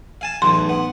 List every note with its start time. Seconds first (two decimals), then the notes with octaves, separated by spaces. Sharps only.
0.21 F5 G#5 A5
0.42 B1 E2 A2 C6
0.69 B3